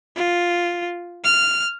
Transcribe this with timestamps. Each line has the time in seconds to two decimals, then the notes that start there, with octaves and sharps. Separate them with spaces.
0.16 F4
1.24 F6